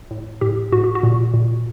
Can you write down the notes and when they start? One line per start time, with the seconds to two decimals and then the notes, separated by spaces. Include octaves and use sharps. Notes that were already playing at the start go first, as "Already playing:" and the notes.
0.11 A2
0.41 A2 G4
0.72 A2 F#4
0.84 G4
0.95 F#4
1.03 A#2
1.34 A#2